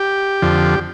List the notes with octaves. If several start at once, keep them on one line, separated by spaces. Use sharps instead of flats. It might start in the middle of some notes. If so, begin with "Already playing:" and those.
Already playing: G4
F2 D3 F3